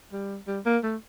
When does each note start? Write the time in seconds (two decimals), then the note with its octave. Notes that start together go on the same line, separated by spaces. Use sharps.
0.12 G3
0.47 G3
0.66 A#3
0.83 A3